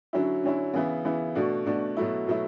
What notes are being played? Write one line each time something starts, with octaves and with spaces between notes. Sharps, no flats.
D3 F#3 C#4 E4
D3 F#3 C#4 E4
C#3 E3 B3 E4
C#3 E3 B3 E4
B2 A3 D4 F#4
B2 A3 D4 F#4
B2 F#3 A3 E4
B2 F#3 A3 E4